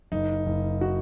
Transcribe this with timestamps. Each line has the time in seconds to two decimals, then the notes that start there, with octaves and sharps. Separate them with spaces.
0.12 F#1 D#4
0.46 F#1
0.81 F#4